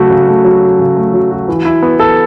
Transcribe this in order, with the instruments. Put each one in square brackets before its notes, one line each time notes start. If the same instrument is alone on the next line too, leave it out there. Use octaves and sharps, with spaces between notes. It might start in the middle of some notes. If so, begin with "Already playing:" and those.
Already playing: [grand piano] C#3 F#3 A3 F#4
C#3
A3
F#3
F#4
C#3
A3
F#3
F#4
E3
E4
B3
A4